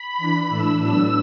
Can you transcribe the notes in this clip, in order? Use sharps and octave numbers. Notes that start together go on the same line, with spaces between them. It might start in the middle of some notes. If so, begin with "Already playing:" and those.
Already playing: B5
E3 D4
A2 E3 A3 D4 E6
A2 F#3 B3 D4 E6